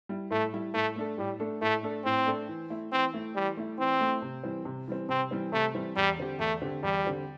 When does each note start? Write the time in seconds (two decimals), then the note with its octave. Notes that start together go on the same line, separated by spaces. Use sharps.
0.09 G3 E4
0.31 A2 A3
0.53 G3 E4
0.74 A2 A3
0.96 A3 D4 A4
1.18 A2 G3
1.40 A3 D4 A4
1.61 A2 A3
1.83 A3 D4 A4
2.05 A2 C4
2.26 A3 D4 A4
2.48 E3
2.70 A3 E4
2.92 E3 C4
3.14 A3 E4
3.35 E3 G3
3.57 A3 E4
3.78 E3 C4
4.01 A3 E4
4.22 C3
4.43 E3 G3 C4
4.65 C3
4.88 E3 G3 C4
5.09 C3 C4
5.31 E3 G3 C4
5.52 C3 A3
5.74 E3 G3 C4
5.96 E2 G3
6.18 D3 C4 G4
6.39 E2 A3
6.62 D3 C4 G4
6.83 E2 G3
7.05 D3 C4 G4